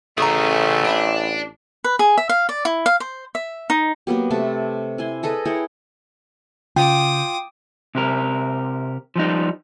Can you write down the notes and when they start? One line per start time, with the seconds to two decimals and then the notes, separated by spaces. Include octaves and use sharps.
0.18 A1 C#3 A3 G#4 A#5 C#6 D#6
0.85 D4 E4 D5
1.84 B4
1.99 G#4
2.18 E5
2.29 F5
2.49 D5
2.65 E4
2.86 F5
3.00 C5
3.35 E5
3.70 D#4
4.07 F#3 A#3 B3 G4
4.30 C3 A3 B4 A5
4.98 E4 G#5 C6
5.23 G#4 A4 B4 D#5
5.45 E4 G#4 C#5 G5
6.76 C#3 F4 G5 D6 D#6
7.95 C3 G4 A#4
9.16 F3 G3 D#4